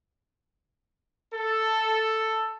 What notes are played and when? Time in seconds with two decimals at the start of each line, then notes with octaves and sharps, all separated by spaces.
1.34 A4